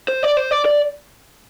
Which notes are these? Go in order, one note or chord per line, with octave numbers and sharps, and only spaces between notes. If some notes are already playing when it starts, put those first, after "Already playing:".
C5
D5
C5
D5
D5